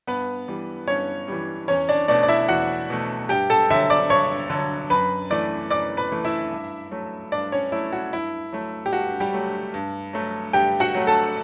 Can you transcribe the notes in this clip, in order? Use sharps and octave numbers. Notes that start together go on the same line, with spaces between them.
G2 B3 B4
E3 G3
G2 C#4 C#5
E3 G3
E2 C#4 C#5
D4 D5
B2 A3 D4 D5
D5
E4 E5
E2 F#4 F#5
B2 A3
G2 G4 G5
A4 A5
D3 F#3 E5 E6
D5 D6
G2 C#5 C#6
D3 F#3
F#2 B4 B5
E3 A3 D5 D6
F#2 D5 D6
B4 B5
E3 A3
E4 E5
G2
F#3 A3
G2 D4 D5
C#4 C#5
F#3 A3 E4
F#4
G2 E4
F#3 A3
G4
G2 F#4
G3 G4
F#3 A3
G2
F#3 A3
G2 G4 G5
F#4 F#5
F#3 A3
A4 A5